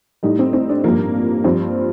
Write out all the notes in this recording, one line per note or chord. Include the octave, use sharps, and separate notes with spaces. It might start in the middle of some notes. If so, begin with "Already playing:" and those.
A2 G3 D#4
C4
C4
D4
G2 F3 A#3
G2 F3 C4